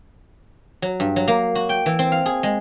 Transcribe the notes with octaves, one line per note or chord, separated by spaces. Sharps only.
F#3
G2
F#3
A#3
F#4
G5
E3
C4
F5
G#4
G#3